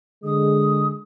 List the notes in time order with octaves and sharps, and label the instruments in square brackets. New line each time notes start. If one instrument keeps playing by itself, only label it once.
[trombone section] D3 G#3 [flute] D#6